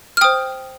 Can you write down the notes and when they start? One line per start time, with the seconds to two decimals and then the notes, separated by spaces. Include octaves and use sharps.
0.17 F6
0.21 C5 G5 D#6